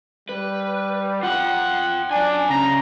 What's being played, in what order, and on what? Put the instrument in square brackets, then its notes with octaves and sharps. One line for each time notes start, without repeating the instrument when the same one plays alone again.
[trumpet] G3 [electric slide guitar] B4
[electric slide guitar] F4 G5 [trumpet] F#5
[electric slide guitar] F#2 G#5 [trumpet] D4
[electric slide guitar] C#3 [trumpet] A#5